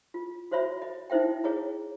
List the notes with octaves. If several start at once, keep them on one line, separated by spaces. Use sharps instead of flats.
F4
F#4 C5 C#5 E5 B5
D#5
D#4 E4 C5 E5 G5
G#4 C#5 D#5 A#5